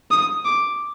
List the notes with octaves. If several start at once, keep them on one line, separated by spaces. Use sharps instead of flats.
D#6
D6